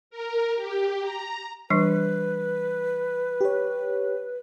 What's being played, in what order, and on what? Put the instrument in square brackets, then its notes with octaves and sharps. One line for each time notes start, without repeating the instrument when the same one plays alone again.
[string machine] A#4
G4
A#5
[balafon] E3 G3 D4 [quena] B4
[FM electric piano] G4 C#5